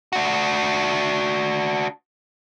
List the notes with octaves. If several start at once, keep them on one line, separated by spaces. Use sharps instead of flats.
D4 F#4